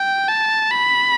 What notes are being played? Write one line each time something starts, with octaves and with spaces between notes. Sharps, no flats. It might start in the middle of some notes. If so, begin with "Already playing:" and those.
Already playing: G5
A5
B5